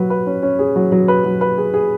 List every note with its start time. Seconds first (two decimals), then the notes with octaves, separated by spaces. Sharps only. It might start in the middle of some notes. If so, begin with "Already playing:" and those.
Already playing: F#3 B4
0.10 B4
0.27 C#4
0.43 C#4
0.59 G#4
0.76 F#3
0.92 F#3
1.08 B4
1.25 F#3
1.41 B4
1.58 G#4
1.74 G#4